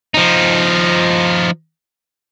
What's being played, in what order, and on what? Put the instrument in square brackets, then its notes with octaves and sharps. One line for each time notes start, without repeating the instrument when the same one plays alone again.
[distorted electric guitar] F3 D#4